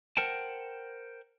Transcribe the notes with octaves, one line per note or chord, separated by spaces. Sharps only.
A#4 C5 F#5 G5 A5